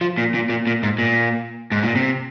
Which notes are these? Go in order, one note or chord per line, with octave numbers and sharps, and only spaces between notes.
F3
A#2
A#2
A#2
A#2
G#2
A#2
G#2
A#2
C3